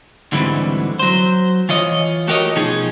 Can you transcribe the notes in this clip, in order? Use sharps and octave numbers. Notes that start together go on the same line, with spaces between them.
D2 G#2 D3 E3 G3 C4
F#3 C5
E3 F4 C#5 D#5
A3 F#4 G4 A#4 C#5 D#5
B2 F3 D#4 G#4